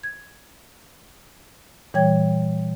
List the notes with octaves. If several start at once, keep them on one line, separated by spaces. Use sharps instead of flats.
G#6
A#2 E3 G3 C#5 G5 G#6